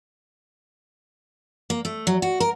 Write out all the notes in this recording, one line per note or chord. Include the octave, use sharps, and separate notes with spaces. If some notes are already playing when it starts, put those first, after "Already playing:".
A#3
A3
F#3
F#4
A#4